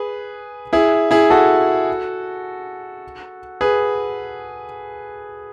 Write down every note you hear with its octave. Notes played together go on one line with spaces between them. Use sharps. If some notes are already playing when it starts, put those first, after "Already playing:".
Already playing: G#4 B4
E4 G#4
E4 G#4
F#4 A4
G#4 B4